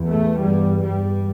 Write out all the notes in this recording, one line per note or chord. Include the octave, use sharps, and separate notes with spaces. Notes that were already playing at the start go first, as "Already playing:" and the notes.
Already playing: E2
A2 A3
G2 G3
G2 G3